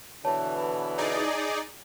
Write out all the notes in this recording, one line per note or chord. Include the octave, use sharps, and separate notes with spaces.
B2 D3 E3 C#5 A5
D#4 G#4 D5